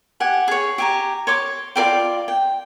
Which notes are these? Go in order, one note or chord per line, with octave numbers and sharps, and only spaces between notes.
G4 F#5 G#5
G#4 C#5
G4 G#5 A#5
C#5 C6 D6
F4 A#4 D5 G5
G5